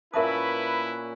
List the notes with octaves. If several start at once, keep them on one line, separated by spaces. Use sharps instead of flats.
A#2 C#4 E4 A#4 B4 E5 A5 D#6